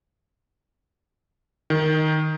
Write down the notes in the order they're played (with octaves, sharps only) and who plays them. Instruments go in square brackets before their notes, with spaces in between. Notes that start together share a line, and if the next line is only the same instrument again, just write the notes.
[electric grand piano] D#3